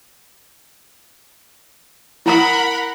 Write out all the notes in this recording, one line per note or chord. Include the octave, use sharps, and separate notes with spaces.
E4 A#4 F#5 A#5 B5 D#6